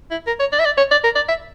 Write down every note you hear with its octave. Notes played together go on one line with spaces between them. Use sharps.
E4
A#4
C#5
D5
E5
D5
C#5
D5
A#4
D5
E5